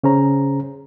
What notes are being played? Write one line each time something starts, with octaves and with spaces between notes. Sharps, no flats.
C#3 C#4 G#4 C5 A#5